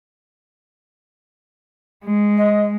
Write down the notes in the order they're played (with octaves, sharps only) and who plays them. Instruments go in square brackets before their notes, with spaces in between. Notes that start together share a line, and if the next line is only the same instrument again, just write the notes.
[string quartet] G#3
[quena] D#5